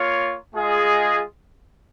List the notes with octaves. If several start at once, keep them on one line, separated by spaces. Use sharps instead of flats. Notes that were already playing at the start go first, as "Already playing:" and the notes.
Already playing: A#3 F4 C#5
G#3 F4 G#4 D#5